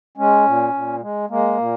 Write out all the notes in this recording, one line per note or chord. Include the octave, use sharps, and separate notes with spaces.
G#3 C#4
A#2
A#2
G#3
G#3 A#3
A#2